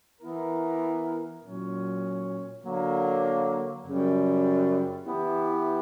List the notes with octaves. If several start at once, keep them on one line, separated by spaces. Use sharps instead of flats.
E3 B3 E4 A#4
A#2 F#3 C#4
D3 F#3 A#3
F#2 C#3 G3
E3 B3 E4 G4